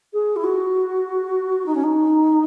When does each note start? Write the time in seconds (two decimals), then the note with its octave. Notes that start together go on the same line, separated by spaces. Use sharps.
0.13 G#4
0.36 E4
0.43 F#4
1.66 D#4
1.75 C#4
1.83 D#4